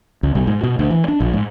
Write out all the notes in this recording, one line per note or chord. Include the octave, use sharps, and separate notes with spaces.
C#2
B1
G#2
B2
D2
E3
D4
A#1
G#2